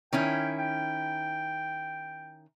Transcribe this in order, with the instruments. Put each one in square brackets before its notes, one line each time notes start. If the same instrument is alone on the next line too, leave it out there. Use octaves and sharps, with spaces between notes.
[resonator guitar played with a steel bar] D#3 C#4 E4 [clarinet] G5
[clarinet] G5